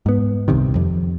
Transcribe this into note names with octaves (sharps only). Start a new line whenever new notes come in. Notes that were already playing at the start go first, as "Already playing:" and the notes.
G#2 B3
D#1 C2 C3 D#3
F2